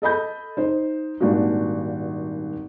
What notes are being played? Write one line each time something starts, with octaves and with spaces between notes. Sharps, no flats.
A4 D#5 B5 G6
D#4 C5
D#1 G#1 A#3 D4 F#4